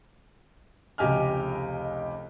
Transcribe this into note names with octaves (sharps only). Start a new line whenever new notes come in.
F1 C#2 G4 D#5 G#5 F6